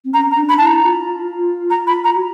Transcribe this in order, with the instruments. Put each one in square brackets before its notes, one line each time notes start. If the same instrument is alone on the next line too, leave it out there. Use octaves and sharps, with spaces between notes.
[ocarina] C4
[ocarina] C#4 [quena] A#5
[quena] A#5
[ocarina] D4
[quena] B5
[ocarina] E4 [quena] A5
[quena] A#5
[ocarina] F4
[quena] A#5
B5
A#5
[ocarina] F#4